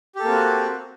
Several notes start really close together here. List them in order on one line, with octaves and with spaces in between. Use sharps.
G4 A4 A#3 C4 F#4